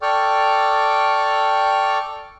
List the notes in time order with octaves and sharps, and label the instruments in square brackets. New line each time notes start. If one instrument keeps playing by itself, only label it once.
[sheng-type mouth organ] A4 D5 G5 C#6 D6 F6